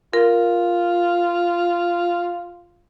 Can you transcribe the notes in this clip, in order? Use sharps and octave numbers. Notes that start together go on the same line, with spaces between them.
F4 A#4